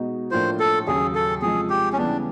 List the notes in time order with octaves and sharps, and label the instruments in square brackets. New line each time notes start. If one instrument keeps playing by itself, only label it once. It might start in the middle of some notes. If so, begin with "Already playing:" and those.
Already playing: [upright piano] B2 G#3 B3 D#4 F#4
[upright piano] A2 F3 A#3 D4 F4 [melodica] C5
[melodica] A4
[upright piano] D#2 C#3 F#3 [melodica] G#4
[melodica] A4
[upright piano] C3 F3 G#3 [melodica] G#4
[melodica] G4
C#4
[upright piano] C#3 E3 G3 B3 [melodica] D4